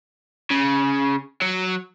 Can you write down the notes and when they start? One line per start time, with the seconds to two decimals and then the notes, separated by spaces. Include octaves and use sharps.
0.51 C#3
1.42 F#3